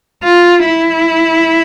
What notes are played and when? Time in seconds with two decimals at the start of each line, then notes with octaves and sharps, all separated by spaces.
0.24 F4
0.65 E4